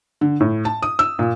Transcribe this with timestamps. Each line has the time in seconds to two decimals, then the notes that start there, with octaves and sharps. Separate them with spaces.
0.21 D3
0.40 A2
0.65 A5
0.82 D#6
0.99 E6
1.19 A#2